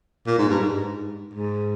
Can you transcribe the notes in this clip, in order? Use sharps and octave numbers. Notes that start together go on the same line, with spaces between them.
A#2
G#2
G2
G#2
G#2